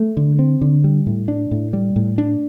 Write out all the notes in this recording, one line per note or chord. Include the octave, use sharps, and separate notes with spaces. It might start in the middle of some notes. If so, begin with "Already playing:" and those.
Already playing: A3
D3
C4
D3
G3
A2
D4
A2
G3
A2
D4